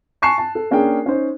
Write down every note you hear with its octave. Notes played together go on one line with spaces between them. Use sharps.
G#5 A5 C#6 F#6 C7 E7
A5
A4
A#3 C#4 D4 G#4 A#4 G5
C#4 D#4 C5